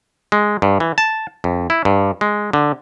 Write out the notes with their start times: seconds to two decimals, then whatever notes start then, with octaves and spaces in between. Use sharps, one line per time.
0.32 G#3
0.62 G2
0.80 E3
0.98 A5
1.44 F2
1.70 E4
1.85 G2
2.21 G#3
2.53 D3